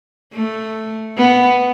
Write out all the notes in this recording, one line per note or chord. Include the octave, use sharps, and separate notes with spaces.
A3
B3